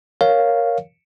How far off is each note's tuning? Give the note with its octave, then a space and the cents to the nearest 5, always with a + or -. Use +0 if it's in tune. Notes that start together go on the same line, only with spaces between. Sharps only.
A#4 +0 C#5 +0 F5 +0